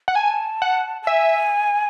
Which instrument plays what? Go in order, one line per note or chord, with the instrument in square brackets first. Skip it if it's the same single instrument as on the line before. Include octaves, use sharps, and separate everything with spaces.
[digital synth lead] F#5
[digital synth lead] G#5 [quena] A5
[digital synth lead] F#5
[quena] A5
[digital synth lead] E5 [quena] G#5